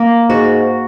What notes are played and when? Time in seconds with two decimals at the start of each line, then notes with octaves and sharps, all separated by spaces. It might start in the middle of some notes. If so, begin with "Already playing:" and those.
Already playing: A#3
0.29 G#2 F#4